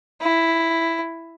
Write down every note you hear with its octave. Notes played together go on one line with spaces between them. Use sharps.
E4